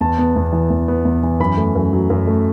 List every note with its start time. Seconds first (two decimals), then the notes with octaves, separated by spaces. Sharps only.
0.01 E2 A5
0.18 B3
0.36 E2
0.53 E3
0.70 E2
0.88 B3
1.05 E2
1.23 E3
1.40 F#2 B5
1.57 A3
1.75 F#2
1.93 F#3
2.10 F#2
2.27 A3